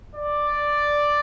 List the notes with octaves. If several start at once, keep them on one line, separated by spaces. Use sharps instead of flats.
D5